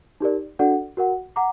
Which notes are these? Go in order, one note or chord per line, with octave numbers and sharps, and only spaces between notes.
D#4 G4 A#4 D5
D4 F#4 A4 D5 F#5
F#4 A#4 F#5
F#5 A#5 D6